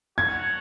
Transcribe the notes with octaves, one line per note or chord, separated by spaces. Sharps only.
F#4 A4 C#5 F#5 G#6